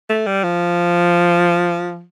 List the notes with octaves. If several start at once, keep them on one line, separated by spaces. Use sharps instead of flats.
A3
G3
F3